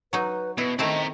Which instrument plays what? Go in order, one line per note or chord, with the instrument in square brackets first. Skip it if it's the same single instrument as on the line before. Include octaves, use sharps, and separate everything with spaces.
[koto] F#3 D#4 [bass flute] B4
[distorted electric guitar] B2 [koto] E4 [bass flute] B4
[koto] D#3 A3 E4 [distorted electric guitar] C4 A#5 [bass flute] D#5